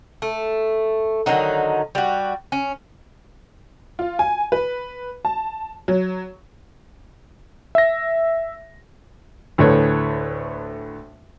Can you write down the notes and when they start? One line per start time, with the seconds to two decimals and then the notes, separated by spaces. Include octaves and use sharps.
0.22 A3
1.26 D3 D#3 F#3 D#4
1.95 G3 F#4
2.52 C#4
3.99 F4
4.19 G#5
4.52 B4
5.25 A5
5.88 F#3
7.75 E5 A#6
9.58 D2 A2 A3 B4 C#5